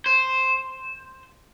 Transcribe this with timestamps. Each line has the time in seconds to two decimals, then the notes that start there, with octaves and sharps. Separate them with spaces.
0.06 C5